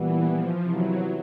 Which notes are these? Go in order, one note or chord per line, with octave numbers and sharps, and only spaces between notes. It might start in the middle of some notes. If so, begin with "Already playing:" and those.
Already playing: A#2 E3 G3 B3
F3
C3 E3 F#3 G3 B3 E4